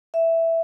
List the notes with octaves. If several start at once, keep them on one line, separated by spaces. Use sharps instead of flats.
E5